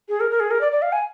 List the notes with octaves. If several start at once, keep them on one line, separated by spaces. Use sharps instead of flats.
G#4
A#4
A#4
G#4
A#4
D5
D5
F5
G#5